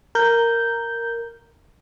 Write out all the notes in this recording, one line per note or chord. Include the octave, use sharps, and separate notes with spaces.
A#4 G6